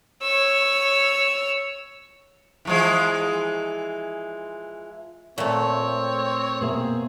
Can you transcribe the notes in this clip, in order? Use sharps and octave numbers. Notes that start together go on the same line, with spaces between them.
C#5 E6
E3 F3 G#3
A#2 A3 C4 C#5
B2 A#3 G#4 E5